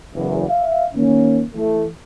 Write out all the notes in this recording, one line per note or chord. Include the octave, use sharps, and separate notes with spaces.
F#1 E2
E5 F5
D#3 A#3 C#4
E3 A3